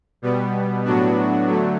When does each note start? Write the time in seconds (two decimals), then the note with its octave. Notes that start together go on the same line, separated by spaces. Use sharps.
0.22 B2 G3 B3
0.85 A2 F#3 B3 D4 F#4
1.48 D3 F#3 A3